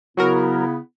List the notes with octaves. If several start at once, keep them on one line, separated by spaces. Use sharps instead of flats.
C#3 F#3 B3 E4 F#4 A#4